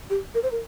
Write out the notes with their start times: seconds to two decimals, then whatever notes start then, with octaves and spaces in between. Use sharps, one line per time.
0.10 G4
0.35 A#4
0.43 C5
0.52 A#4